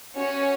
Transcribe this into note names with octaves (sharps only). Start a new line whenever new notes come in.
C#4 F#4 C#5